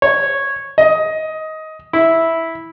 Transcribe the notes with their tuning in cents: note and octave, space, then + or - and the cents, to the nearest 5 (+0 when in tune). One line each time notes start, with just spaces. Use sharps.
C#5 -10
D#5 +15
E4 -5